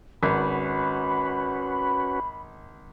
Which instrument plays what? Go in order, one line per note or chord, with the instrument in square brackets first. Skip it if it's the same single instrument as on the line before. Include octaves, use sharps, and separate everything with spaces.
[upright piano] G#1 [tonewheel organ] C#4 F#4 B4 [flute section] B5